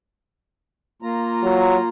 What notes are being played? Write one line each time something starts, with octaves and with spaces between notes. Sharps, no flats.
A#3 F4 A#5
F#3